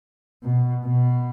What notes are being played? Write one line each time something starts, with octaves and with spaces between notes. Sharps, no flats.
B2
B2